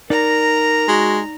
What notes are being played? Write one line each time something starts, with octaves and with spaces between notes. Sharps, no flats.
D#4 A#4 D5 A#5
G#3 F#4